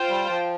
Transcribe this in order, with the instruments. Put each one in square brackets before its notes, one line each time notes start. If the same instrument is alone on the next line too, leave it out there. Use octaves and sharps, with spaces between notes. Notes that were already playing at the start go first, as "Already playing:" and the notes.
Already playing: [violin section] F4 C5 G5
[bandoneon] G3
F3